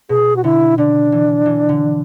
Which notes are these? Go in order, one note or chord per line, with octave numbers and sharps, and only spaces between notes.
B2 G#4
F#4
D3 E4
D3 D4
E3
E3
D3